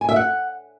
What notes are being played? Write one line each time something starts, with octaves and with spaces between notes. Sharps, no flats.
G#5
E5
F#5